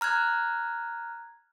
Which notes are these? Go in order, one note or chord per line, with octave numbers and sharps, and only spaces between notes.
A#5 F6 F#6 G#6